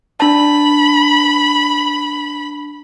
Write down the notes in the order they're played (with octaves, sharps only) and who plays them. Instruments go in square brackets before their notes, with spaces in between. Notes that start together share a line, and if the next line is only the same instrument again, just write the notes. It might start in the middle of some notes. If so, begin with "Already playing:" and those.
[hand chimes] D4 A5 [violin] B5